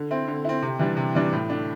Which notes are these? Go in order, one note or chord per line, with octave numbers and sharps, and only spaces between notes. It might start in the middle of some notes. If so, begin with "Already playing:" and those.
Already playing: D3
C4 E4
D3
C4 E4
C3
E3 G3 D4
C3
E3 G3 D4
A2
A3 D4